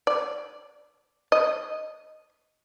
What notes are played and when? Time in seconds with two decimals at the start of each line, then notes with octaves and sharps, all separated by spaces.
0.07 D5
1.32 D#5